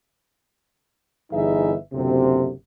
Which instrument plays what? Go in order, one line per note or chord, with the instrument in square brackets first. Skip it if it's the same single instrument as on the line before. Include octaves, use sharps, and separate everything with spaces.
[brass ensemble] G1 E3 D#4 G#4 E5
F#1 D2 C3